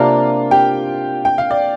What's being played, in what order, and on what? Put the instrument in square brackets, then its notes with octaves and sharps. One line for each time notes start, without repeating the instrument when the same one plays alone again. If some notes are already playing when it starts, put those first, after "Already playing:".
Already playing: [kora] C3 A#3 D4 A#4 [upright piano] F4 F5
[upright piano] G4 G5
G5
F5
D5